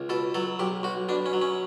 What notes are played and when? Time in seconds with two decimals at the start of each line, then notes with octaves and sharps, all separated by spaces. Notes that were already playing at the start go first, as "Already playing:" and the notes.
Already playing: C#2
0.09 B2 A4
0.34 F#3 A4
0.59 B1 G4
0.83 B1 F#4
1.09 B2 D4
1.26 C#4
1.33 F#3
1.42 C#4